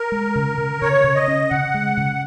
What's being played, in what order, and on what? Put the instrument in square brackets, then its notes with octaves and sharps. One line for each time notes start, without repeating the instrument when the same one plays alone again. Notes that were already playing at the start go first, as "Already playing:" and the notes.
Already playing: [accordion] A#4
[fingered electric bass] G#3
C#3
C#3
[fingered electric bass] C#3 [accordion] C#5
[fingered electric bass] C#3
[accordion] D#5
[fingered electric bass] C#4
[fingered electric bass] C#3 [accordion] F#5
[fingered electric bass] G#3
C#3